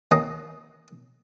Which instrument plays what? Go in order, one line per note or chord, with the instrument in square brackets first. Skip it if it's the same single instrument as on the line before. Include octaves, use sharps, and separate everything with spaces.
[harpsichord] D#3 A#3 C#4 A#5 D#6